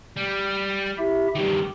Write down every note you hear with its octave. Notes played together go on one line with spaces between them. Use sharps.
G3
E4 G4 E5
G2 D#3 G4